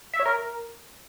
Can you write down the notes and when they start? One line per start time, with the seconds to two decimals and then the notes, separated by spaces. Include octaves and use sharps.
0.14 E5
0.20 C#5
0.26 A#4